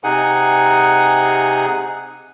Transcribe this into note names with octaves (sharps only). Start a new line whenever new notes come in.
C3 D#4 G#4 F#5 G#5